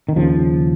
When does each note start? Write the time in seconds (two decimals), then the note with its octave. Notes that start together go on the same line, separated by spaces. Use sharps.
0.09 D#3
0.16 D#2 C#3 F3